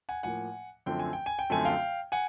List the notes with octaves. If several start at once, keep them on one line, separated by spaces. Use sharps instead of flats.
F#5 G#5
A2 F3 A#3 F#5 G#5
F#2 D3 F3 A3 C4 G5
G#5
G5
G#5
G5
F#2 D3 F3 A3 C4 G#5
F5 G5
F#5 G#5